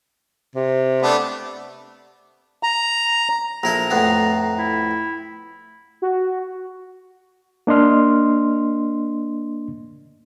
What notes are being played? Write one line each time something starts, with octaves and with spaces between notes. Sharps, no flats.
C3
A3 B3 D4
A#5
A#1 E4 A4 A#5
F2 A2 B3
E4
F#4
A#3 D4 D#5 C6 F6